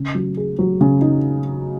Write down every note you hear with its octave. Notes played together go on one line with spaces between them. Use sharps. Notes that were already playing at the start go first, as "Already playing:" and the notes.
Already playing: C#3
F#3
G#4
F#3
C#3
D#4